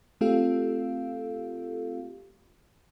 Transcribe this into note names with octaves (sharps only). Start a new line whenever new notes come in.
A3 C4 F4 G4 A4 F5